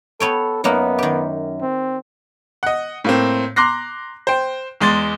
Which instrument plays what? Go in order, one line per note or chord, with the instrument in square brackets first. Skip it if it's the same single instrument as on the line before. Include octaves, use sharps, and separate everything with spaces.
[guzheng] B3 C#5 G5 [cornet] A4
[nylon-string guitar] F#2 [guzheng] A#3 D#4 F#5 [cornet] B3
[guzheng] D#3 G4
[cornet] C4
[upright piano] D#5 F#5
A2 A#3 C4
A#5 C6 D6 F#6 A#6 C7
C5 G5
E2 G#3 C6 A6